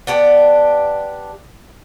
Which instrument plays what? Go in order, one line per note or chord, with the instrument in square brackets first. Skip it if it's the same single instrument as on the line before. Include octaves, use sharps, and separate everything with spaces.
[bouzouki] B3 D4 G4